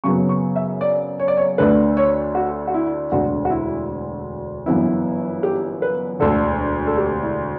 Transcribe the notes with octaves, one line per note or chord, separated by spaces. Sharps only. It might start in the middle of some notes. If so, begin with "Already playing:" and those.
F#2 C#3 F#3 B3 C#6
C#6
E5
D5
C#5
D5
C#5
D2 D3 A3 D4 B4
C#5
F#4
F#4
E4
E1 D2 D3 F#4
F#4
E4
G1 F#2 E3 B3 E4
G4
B4
E1 D2 D3 A4
A4
G4
E4